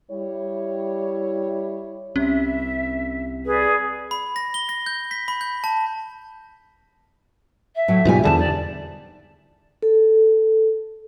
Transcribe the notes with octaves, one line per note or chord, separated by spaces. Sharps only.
G3 E4 C#5
C2 C3 C#4 E5
G#4 B4 D5
B5
A#6
G7
A#6
G6
B6
B5
G6
A5
E5
A2 F#3 A3
G#2 B2 G3 F4 G4 G#5
E2 D3 G3 G#4 C5 A5
D#4 D5
A4